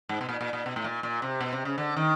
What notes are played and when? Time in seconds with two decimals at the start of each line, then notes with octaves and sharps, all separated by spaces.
0.09 G#2
0.21 B2
0.29 A#2
0.41 A#2
0.53 A#2
0.66 B2
0.76 A2
0.84 A#2
1.03 A#2
1.22 C3
1.41 B2
1.53 C3
1.65 C#3
1.78 D3
1.97 D#3